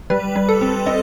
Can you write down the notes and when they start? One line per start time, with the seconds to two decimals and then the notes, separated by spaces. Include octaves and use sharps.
0.10 G3 B4
0.36 G3
0.49 A4
0.61 C4
0.86 C4 D#5